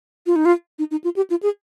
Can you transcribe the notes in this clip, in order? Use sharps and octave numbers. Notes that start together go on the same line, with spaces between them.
F4
D#4
F4
D#4
D#4
F4
G4
F4
G#4